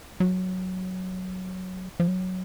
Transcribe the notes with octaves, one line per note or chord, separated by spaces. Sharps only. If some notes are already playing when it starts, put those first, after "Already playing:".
F#3
F3
F#3